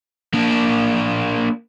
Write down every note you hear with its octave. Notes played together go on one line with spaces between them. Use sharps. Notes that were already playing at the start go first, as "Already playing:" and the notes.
A#3 D4